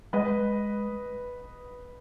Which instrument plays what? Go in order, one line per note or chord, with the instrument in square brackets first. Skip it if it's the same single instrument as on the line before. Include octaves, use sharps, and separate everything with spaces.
[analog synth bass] G#3 [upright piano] B4 D#5